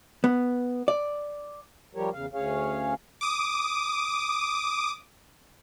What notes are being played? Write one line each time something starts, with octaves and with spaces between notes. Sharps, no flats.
B3
D5
F3 G3 G4 A#4 C#5
E2 C#3 F5
D2 C#4 G#4 C#5 F5
D6 D#6